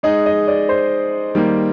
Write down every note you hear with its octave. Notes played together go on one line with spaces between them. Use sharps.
G#3 D#4 G#4 D#5
D#5
D5
C5
D#3 G3 A#3